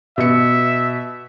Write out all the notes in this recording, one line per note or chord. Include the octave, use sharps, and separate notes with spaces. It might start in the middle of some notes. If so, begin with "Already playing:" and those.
B2 E5 C#7